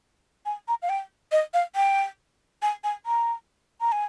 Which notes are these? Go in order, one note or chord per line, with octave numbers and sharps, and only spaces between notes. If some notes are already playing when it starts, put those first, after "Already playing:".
G#5
A#5
F5
G5
D#5
F5
G5
G#5
G#5
A#5
A#5
G#5